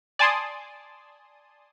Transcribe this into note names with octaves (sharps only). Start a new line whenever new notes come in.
D5 G#5 A5 C6 D#6